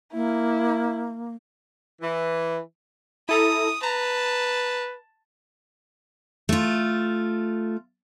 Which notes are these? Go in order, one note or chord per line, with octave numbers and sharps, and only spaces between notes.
A#3 E4
E3
E4 A4 A#5 D#6
B4 A5 A#5
A3 F4